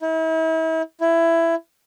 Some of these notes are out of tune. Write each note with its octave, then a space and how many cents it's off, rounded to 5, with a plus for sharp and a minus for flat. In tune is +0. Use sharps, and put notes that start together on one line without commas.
E4 -40
E4 +15